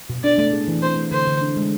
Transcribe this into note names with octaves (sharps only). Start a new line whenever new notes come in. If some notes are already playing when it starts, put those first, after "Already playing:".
B2
D4 D5
A3
G#4
E3
C4 C5
A3
D3 C5
D3
D4
G#3